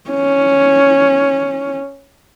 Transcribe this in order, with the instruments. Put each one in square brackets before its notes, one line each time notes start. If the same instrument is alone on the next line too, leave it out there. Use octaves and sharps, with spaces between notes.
[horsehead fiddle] C#4